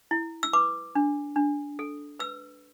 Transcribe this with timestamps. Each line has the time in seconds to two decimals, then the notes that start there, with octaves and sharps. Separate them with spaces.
0.11 E4
0.43 E6
0.53 B4 D6
0.95 D4
1.36 D4
1.79 A4
2.19 B4 E6